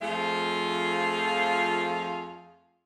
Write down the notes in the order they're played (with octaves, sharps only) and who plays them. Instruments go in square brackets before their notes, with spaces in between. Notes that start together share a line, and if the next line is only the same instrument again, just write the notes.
[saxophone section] F2 F3 A3 F4 G#4 F5